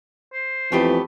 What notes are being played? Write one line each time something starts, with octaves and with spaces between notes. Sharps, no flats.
C5
F2 E3 A3 B3 G4